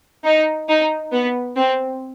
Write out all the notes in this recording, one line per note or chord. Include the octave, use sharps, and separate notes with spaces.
D#4
D#4
B3
C4